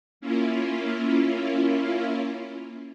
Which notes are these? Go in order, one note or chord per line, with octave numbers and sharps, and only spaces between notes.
A#3 C#4 E4 F4